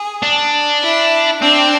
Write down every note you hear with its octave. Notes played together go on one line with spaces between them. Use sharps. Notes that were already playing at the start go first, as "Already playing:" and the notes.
Already playing: G#4
D4
E4
C4 D4